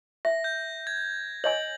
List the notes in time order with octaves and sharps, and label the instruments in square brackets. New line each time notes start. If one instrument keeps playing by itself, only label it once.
[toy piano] E5 [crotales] A#6
[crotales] G6
G#6
[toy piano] C#5 D#5 G#5 [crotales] F#7